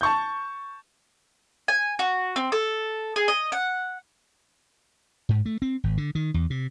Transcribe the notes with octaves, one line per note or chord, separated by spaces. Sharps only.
A5 C#6 G6
G#5
F#4
C4
A4
G#4
D#5
F#5
G#2
A3
C4
G#1
D3
D#3
E2
C3